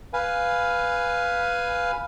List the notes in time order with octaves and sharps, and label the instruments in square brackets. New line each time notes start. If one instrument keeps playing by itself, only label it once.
[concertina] B4 F5 G#5